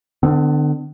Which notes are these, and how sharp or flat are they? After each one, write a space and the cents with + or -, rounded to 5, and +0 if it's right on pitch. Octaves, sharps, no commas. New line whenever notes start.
D3 +25 C4 -45